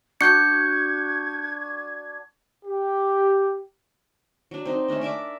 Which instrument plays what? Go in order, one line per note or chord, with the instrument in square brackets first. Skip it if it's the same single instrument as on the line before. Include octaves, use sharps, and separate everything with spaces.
[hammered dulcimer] D4 F#4 [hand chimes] G6 C#7 [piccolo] G#6
[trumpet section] G4
[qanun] F#3 D4
C4 D#4
A3 C#4 D4 D#5
A#4 D5 E5 D6